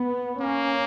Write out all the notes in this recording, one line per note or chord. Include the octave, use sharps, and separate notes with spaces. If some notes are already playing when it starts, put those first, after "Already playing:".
Already playing: B3
A#3 C#4